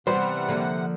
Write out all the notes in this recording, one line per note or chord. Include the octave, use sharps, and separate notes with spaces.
C3 E3 G3 B3 C5 F#5
D3 F3 A#3